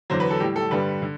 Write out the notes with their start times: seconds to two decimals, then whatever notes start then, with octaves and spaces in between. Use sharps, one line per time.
0.10 E2 D3 F#3 C5
0.20 B4
0.31 A4
0.40 A2 G3 G4
0.56 A4
0.71 G2 D3 G3 B4
1.02 D3